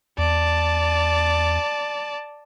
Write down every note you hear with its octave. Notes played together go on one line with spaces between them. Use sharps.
E2 D5 A5